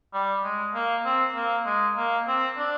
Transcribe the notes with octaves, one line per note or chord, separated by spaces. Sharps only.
G3
G#3
A#3
C4
A#3
G#3
A#3
C4
D4